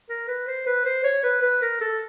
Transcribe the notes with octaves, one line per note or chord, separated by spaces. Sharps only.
A#4
B4
C5
B4
C5
C#5
B4
B4
A#4
A4